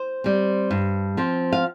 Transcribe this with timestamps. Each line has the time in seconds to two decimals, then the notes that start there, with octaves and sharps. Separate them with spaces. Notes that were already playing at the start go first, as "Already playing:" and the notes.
Already playing: C5
0.24 G3 C4
0.71 G2
1.17 F3 C4
1.53 F5